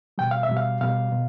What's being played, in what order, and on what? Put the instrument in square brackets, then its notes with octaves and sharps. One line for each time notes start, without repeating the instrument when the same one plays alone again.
[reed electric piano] B2 G3 G5
F5
E5
B2 G3
F5
B2 G3 F5
B2